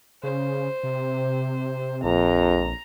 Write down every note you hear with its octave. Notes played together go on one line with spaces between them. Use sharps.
C#3 C5
C3
A#1 F2 A#5